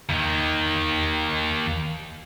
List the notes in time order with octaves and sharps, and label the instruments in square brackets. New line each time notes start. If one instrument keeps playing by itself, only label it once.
[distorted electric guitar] D#2 D#3